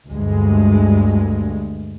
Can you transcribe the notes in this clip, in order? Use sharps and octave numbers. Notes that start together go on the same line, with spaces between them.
D2 G2 G#3